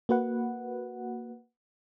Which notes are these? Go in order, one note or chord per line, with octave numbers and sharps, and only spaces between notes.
A#3 F#4 B4 F#5